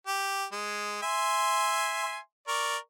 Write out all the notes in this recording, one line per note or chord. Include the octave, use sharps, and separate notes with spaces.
G4
G#3
E5 G#5 C6
A#4 D5 C#6